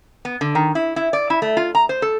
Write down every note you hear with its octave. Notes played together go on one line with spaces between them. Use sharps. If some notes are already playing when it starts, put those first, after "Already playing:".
B3
D3
D#3
E4
E4
D5
E4
A3
F4
A#5
C5
A4